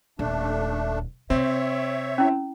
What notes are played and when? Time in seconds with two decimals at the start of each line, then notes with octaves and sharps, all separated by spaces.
0.19 D#1 A3 D4
1.30 C3 C4 C#5 E5
2.18 C#4 E4